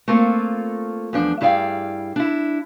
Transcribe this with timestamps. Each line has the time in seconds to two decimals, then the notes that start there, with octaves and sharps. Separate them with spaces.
0.08 A3 A#3 C4 F4 A4
1.13 E2 F3 D4
1.41 G2 E4 G#4 D5 F5 G5
2.16 D4 E4